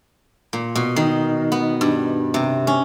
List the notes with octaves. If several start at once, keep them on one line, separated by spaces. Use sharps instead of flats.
A#2
B2
D#3
B3
G2
C3
C#4